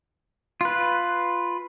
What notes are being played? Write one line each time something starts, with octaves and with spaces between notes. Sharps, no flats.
F4 B4